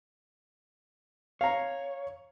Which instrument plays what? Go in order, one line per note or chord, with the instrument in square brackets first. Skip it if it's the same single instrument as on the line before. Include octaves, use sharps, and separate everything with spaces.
[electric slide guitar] C#5 [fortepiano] F5 A#5